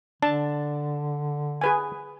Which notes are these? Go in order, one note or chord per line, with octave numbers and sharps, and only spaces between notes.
D3 D4 A5
G#4 B4 G#5